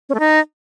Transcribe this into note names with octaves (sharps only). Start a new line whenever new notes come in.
C#4
A3
D#4